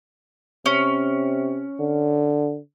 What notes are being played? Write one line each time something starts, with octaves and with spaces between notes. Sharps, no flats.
C3 C#4
D3